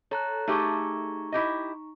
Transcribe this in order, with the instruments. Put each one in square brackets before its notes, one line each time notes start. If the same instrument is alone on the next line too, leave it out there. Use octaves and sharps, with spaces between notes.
[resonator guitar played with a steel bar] A4 [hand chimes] C#5 A#5 F#6
[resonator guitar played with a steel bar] A3 G4 G#4 [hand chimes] D#4 A#5 C#6
[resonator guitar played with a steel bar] E4 G4 D#5